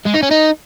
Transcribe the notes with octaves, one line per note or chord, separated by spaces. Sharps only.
G#3
D#4
C#4
D#4